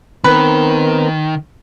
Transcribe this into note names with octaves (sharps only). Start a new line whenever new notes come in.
D#3 B3 C4 A#4 B4